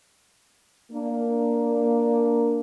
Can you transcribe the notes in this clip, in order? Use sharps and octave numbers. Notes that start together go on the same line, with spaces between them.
A#3 D4